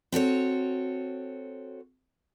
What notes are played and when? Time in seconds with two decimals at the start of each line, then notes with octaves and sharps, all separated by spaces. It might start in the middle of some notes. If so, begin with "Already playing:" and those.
0.12 C4 F#4 A4 C#5